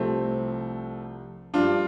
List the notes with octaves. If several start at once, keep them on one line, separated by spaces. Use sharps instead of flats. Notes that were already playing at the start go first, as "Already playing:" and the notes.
Already playing: C2 C3 F3 A3 C4
G2 F3 D4 F4